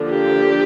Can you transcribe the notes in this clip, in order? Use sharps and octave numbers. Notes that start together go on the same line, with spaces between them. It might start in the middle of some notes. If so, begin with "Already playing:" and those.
Already playing: D3 F3 A#3 D4
G4